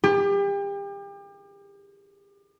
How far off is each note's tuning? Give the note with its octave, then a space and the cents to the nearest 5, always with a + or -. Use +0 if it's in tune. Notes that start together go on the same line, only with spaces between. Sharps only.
G4 +35